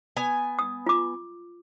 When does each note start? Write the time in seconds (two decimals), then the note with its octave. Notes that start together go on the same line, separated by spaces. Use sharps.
0.17 B3 G#5
0.59 D#6
0.86 F4 D6